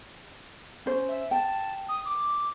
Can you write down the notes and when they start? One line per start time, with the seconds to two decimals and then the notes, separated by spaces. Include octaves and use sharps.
0.86 C#4 C5
1.09 E5
1.31 G5 A5
1.89 D#6
2.05 D6